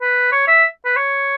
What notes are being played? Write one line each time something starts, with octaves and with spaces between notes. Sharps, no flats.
B4
C#5
E5
B4
C#5